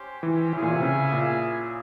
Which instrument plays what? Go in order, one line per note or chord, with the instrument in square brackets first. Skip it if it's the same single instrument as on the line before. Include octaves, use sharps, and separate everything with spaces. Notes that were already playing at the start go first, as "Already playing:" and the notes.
Already playing: [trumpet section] C#4 G4 C5
[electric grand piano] E3
[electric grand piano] E3 [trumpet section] C#4 E4 G#4 E5
[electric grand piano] A#2
C3
C#3
A#2